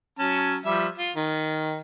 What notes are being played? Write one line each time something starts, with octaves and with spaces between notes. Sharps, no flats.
F#3 C#4 A5
F3 G3 E5
F4
D#3